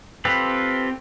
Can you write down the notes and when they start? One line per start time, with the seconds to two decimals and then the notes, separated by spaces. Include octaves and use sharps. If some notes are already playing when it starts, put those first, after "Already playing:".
0.25 C4 F4 G4 A4 B4